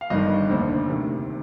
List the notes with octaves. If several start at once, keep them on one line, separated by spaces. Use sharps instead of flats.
F5
G1 G2 D#3 D#5
F1 D#2 D3 C5
D2 C3 D#3